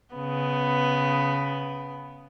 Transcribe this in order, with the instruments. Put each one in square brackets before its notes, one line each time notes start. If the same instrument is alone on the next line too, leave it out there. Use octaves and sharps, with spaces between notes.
[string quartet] C#3 B3